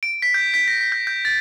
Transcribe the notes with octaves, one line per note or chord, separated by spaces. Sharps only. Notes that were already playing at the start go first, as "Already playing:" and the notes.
D7
B6
G6
B6
A#6
B6
G6
G6
A6